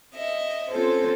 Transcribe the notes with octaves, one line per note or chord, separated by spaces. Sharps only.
D#5 E5
C4 C#4 F4 A4 C5